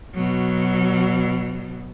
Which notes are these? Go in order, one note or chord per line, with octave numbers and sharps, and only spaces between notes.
B2 F#3